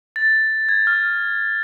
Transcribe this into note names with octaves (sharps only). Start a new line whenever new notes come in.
A6
G#6
F6